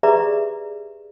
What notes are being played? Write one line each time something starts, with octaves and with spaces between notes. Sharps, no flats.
G4 G#4 B4 D5 E5 A#5